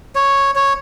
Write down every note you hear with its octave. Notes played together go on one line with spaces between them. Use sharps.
C#5
C#5